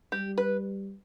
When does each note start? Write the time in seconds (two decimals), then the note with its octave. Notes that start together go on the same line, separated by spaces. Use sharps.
0.12 G3 G4
0.38 B4